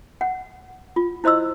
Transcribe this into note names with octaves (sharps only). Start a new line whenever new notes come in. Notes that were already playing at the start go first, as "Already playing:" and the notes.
F#5
F4
E4 C5 D#5 C6 E6